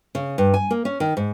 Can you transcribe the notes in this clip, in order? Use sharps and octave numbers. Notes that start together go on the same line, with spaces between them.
C#3
G2
G#5
A#3
C#4
D#3
G#2